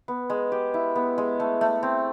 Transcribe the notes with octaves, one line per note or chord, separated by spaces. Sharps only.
B3
G#3
G4
E4
B3
G#3
A3
A3
C4